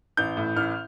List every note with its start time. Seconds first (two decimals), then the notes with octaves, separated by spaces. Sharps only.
0.17 A1 G6
0.37 A2
0.56 A1 F6